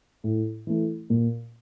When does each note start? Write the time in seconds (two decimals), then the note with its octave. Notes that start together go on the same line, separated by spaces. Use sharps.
0.24 A2
0.67 E3 A3
1.10 A#2